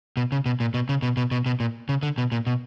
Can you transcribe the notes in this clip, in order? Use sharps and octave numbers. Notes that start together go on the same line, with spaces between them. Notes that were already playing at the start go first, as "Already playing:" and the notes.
B2
C#3
B2
A#2
B2
C#3
B2
B2
B2
B2
A#2
C#3
D3
B2
A#2
B2